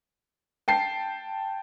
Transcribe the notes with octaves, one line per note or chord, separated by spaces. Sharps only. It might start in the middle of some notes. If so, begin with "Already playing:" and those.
G5 A5 C7